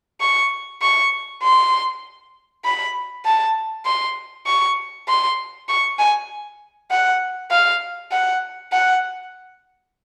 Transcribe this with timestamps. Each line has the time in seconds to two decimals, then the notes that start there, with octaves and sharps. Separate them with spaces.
0.21 C#6
0.82 C#6
1.43 C6
2.64 B5
3.25 A5
3.86 C6
4.46 C#6
5.08 C6
5.69 C#6
5.99 G#5
6.90 F#5
7.51 F5
8.12 F#5
8.72 F#5